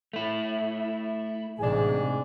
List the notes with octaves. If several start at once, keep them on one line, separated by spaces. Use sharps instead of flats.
A3 E4
A1 G#2 C3 D4 G#4 G#5